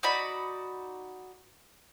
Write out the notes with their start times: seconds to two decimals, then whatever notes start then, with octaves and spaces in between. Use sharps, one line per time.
0.03 D#4 F#4 D5 B5